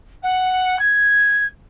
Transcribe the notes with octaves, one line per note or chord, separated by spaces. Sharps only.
F#5
G#6